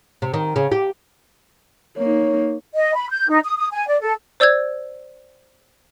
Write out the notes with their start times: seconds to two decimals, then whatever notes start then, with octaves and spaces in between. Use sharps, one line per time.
0.22 C3
0.34 D#3
0.56 C#3
0.72 G4
1.97 A#3 D#4 C#5
2.75 D#5
2.95 B5
3.09 G6
3.29 D#4
3.44 D#6
3.57 D#6
3.72 G#5
3.88 D5
4.02 A4
4.40 C5 D5 E6 G6 G#6